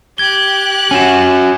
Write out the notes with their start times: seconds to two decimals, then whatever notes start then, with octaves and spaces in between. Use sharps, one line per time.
0.18 G4 F#6 G#6 G7
0.91 C#4 F#4 G#5 E7